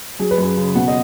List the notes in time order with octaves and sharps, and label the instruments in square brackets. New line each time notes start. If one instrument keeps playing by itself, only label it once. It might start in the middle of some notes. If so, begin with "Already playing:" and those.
[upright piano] F#3 G#4
B4
F#2 G#4
C#3
B2 F#5
D#5